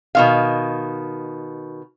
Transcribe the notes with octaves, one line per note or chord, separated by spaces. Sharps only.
B2 D#3 F5